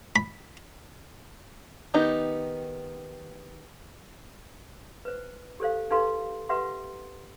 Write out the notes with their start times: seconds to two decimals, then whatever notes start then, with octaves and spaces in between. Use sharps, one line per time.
0.16 B5
1.94 D#3 B3 D#4 G4
5.05 B4 C5
5.60 G4 A4 C5 F5
5.91 D#4 G4 A4 B4 F5 C6
6.49 G4 B4 E5 F#5 C6